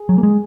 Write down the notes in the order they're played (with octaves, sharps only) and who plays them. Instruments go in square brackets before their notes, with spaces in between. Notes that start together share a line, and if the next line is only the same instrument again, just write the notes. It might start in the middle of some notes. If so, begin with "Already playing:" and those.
Already playing: [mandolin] G#4
[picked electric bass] F#3
A#3
G#3